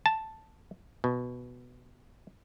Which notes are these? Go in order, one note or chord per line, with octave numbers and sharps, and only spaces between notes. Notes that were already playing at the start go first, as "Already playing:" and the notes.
A5
B2